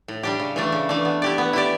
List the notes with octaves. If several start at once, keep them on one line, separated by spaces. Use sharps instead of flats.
A2
G3 D4 G4
C#3
E3 A3 D4
C#3
E3 A3 D4
B3
E4 G4 D5
B3
E4 G4 D5